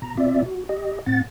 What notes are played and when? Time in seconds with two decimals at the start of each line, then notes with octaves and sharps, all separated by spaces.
0.02 B2 A#5
0.17 B2 C4 F4 D5 E5
0.46 F#4
0.69 G4 D#5
1.06 A2 C4 F#5 A6